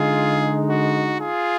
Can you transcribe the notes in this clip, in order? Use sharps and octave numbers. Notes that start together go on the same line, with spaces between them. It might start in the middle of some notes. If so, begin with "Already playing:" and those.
Already playing: D3 G#3 D#4 F4 G#4
F#4
F4 G#4